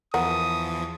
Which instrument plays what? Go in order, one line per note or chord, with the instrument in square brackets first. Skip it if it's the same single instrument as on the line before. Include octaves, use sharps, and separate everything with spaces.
[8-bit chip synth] E2 E3 F3 [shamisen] A#4 F#5 [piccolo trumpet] D#6